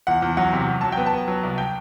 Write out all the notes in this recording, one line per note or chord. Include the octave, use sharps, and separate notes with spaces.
E2 F#5
E2
F#3 F#5
C3
F#3
F#3 A5
B3 G5
A5
B3
F#3
C2
G5